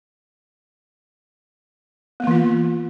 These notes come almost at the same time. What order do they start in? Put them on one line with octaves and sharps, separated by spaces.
B3 A#3 E3 F4